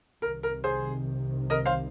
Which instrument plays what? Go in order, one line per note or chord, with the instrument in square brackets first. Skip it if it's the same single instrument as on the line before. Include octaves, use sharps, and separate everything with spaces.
[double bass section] C2 C3 D#3 [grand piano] A#4
[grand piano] A#4
G#4 C5
A#4 D#5
C5 F5